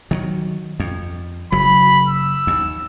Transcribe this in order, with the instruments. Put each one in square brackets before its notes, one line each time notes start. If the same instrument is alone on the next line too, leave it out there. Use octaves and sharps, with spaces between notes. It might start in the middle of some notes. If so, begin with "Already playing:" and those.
[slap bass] D#3 E3 F#3
F2
[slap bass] F#1 F#3 [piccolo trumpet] B5
[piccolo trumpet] E6
[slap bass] D#2